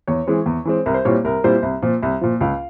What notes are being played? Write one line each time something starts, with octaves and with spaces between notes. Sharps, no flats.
E2 C#5
E3 G#3 C4
E2
E3 G#3 C4
C2 A#4
C5
A#2 G3 C4 E4 C#5
C2 A#4
A#2 G3 C4 E4 C5
C2
A#2 F3
C2
A#2 F3
C#2 F5